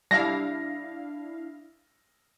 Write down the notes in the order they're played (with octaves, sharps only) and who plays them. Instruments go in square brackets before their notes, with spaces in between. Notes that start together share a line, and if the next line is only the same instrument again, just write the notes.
[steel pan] G3 [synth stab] D4 E4 F5 [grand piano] A#6